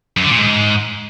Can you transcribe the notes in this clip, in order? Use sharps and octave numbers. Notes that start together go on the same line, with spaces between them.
F#2
D3
A#2
G#2